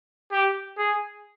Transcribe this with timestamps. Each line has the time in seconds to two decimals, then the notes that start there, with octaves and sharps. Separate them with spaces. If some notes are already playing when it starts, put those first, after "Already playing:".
0.32 G4
0.78 G#4